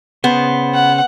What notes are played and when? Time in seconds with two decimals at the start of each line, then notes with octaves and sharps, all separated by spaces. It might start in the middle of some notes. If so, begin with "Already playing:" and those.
0.24 C#3 B3 C5
0.74 F#5